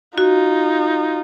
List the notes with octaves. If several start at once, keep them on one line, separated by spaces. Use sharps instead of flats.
D#4 F4 F#4